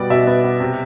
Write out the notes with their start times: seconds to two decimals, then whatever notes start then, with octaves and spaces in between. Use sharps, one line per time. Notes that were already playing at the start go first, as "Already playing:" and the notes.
Already playing: B2 G3 B3 D5
0.10 B2 E5
0.27 B3
0.44 B3
0.60 C3